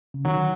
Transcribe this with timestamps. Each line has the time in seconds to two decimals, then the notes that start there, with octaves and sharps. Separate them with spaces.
0.14 C#3
0.25 D#3 F#3